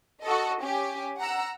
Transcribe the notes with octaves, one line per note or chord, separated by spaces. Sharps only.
F#4 A4 D#5
C#4 G4 G#5
F#5 A#5 E6